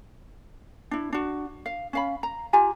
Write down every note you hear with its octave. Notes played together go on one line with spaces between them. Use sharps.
D4 E4
D4 F#4
F5
C#4 F5 B5
A#5
F4 G4 G#5 A#5